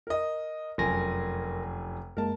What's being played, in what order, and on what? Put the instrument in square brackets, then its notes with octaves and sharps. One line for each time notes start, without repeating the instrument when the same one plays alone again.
[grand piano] A#4 D#5
[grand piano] F1 F#2 G#5 [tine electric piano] A#4 C6 A#6
[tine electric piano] F#2 G#3 A#3 [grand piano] A#4 A5